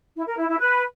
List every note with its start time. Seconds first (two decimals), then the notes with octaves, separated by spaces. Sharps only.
0.15 E4
0.26 A#4
0.37 E4
0.48 E4
0.58 B4